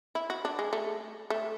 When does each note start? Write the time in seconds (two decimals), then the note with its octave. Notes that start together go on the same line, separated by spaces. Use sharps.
0.15 E4
0.30 F#4
0.45 D4
0.59 G#3
0.73 A3
1.30 A3